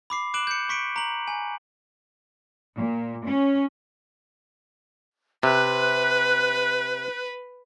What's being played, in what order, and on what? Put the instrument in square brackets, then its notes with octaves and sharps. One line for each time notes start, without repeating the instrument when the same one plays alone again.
[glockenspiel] B5 D6 C7
D6 F#6 D7 E7 F#7
G6 C#7
C#6 B6 C#7 D7
A#5 F#7
G#5
[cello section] A#2
C#4
[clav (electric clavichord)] C3 [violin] B4 [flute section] F#6